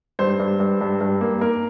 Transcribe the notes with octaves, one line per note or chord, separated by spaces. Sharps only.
G2 C5
G2
G2
G2
G2
A#3
A#3 A#4